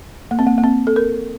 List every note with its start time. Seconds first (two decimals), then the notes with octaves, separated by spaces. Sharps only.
0.31 A#3
0.39 C4
0.47 A#3
0.58 A#3
0.64 C4
0.87 A4
0.96 A#4